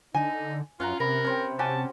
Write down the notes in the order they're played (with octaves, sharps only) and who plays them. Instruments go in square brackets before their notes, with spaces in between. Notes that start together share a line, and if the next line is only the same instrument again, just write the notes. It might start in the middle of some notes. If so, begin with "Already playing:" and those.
[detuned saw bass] D3 [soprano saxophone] D#4 [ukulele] G#5
[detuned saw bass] F#2 [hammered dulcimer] C#4 F#5 A#5 [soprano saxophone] F4
[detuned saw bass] C3 [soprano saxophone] A#4 [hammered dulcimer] B5
[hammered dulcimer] C#4 C5 G5
[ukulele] C#4 G4 G#5 [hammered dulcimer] F#4 [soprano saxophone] A5